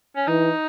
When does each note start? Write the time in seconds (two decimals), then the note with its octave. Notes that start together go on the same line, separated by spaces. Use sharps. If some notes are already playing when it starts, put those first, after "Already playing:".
0.16 C#4
0.27 E3 D#4